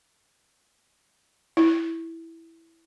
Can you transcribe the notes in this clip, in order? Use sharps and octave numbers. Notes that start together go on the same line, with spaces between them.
E4